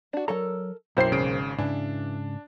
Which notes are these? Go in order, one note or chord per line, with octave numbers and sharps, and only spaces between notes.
D4 F#4
F#3 A4 A#4 C#5 A#5
B1 F#2 A#3 E4 C5 G5 C7
G#1 C#3 D7
G#2 C#3 E3 D4